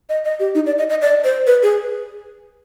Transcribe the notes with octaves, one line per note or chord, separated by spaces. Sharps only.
D#5
D#5
G4
D#4
D5
D#5
D#5
D5
C5
B4
G#4